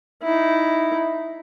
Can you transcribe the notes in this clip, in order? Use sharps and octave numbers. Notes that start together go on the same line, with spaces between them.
D#4 E4